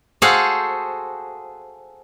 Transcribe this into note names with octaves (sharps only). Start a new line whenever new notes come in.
F#4 G#4 A4 C5 F5 F#5